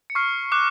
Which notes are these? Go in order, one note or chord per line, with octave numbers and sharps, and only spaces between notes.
C#7
C#6 F6 C7
D6 F#6